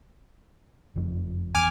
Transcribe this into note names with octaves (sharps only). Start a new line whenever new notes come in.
F#1 F2 F3
E2 G#5 D6 F6